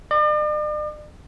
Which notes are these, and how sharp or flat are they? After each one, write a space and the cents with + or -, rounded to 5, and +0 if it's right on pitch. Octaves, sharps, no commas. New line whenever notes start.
D5 +45